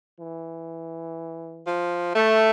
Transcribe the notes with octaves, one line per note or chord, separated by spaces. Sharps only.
E3
F3
A3